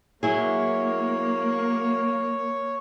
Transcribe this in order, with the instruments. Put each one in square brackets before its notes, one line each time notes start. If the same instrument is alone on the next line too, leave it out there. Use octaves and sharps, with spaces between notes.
[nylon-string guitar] F#3 E4 G#4 [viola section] A#3 [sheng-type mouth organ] C#5